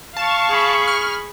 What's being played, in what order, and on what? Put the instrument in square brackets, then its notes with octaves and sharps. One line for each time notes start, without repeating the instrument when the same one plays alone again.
[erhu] F5 [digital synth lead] A5 [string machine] C#6
[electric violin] G#4 B5
[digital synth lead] F6